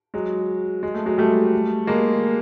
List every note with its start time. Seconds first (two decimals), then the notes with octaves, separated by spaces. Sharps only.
0.14 F#3 G#3
0.83 G#3
0.94 A3
1.06 F#3 G#3
1.18 G3 A3
1.87 G#3 A#3